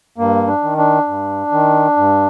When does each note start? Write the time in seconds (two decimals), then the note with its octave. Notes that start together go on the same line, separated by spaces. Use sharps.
0.18 G2 A#3
0.47 D4
0.63 D#3
0.78 D4
1.07 G2
1.52 D#3
1.97 G2